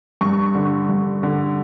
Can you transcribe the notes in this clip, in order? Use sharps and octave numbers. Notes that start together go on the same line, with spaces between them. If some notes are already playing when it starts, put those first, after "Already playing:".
G2 C#6
D3
G2
D3